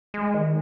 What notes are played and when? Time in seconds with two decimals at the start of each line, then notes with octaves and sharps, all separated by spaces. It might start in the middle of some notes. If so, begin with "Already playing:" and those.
0.14 G#3
0.34 D#3